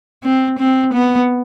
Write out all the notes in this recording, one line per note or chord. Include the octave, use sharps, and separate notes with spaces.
C4
C4
B3